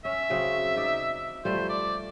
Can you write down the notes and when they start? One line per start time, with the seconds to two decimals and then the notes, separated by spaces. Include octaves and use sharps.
0.05 C#4 E5
0.30 C#3 F#3 C4
0.76 D#4 D5
1.45 F3 G3 A3 C5
1.69 D5